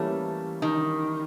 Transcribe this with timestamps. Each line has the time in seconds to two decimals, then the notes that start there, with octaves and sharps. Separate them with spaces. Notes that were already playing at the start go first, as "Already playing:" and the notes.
Already playing: E3 G3 A3 A#3 C#4
0.62 D#3